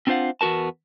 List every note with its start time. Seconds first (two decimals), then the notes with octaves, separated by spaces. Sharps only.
0.07 C4 D4 F4 C5 F5 F#5
0.41 E2 B3 F#4 A#4 A5